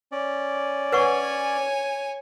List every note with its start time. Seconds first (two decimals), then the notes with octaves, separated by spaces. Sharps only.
0.12 C#4 D5
0.92 B4 C#5 F#5 G#5 C#6